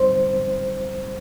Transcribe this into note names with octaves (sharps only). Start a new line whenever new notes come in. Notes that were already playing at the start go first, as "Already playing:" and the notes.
Already playing: G#2 G3 C4 D#4 C5